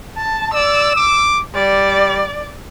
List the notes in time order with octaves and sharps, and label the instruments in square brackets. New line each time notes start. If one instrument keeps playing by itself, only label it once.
[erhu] A5
[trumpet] D5 [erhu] E6
[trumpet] D6
[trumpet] G3 [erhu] D5